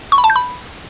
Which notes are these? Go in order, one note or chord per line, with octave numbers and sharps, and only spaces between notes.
C#6
B5
A5
G6
B5